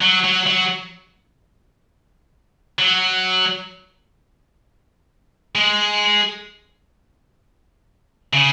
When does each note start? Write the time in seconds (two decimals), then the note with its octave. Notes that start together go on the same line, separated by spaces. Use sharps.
0.01 F#3
0.24 F#3
0.47 F#3
2.79 F#3
5.56 G#3
8.33 C#3